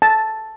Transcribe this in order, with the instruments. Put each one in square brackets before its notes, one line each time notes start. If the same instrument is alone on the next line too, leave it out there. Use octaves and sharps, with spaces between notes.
[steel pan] A5